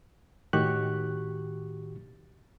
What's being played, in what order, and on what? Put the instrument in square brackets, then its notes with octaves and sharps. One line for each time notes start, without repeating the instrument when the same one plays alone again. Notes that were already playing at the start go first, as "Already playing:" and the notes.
[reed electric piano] A2 D#3 F#4 G4 C#6 F#6